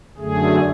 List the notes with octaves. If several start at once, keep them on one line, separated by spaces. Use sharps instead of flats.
F#2 D3 A3 G#4